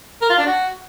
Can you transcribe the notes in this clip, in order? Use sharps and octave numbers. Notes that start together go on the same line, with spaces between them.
A#4
F4
D4
F#4